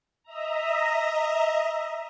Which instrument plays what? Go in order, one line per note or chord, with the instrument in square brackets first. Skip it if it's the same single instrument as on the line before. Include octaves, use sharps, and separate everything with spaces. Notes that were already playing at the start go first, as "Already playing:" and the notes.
[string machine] D#5 E5 A#5